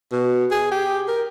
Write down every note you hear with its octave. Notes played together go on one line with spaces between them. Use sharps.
B2
G#4
G4
A#4